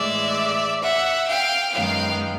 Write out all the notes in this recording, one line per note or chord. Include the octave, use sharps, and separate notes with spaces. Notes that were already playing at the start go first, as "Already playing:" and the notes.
Already playing: A2 E3 G#3 D5 E5
E5 F#5
F5 G5
F#2 D#3 G#3 B3 F5 G5